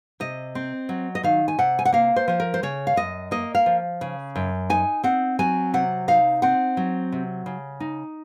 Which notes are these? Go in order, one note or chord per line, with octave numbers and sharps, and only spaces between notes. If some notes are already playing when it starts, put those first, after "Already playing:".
C3 D#5
C4
F#3
D#5
D#3 F5
G#5
C3 F#5
G#5
F#5
A#3 F5
C5
F3 C5
A#4
C5
C#3 C#5
F5
F#2 D#5
A#3 D#5
F5
F3
C#3
F#2
D#4 G#5
C4 F#5
F#3 G#5
C3 F#5
D#4 F5
C4 F#5
F#3
C3
C#3
D#4